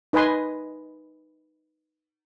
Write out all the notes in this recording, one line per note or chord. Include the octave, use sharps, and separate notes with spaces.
D#4 B4 D#5 G#5 C6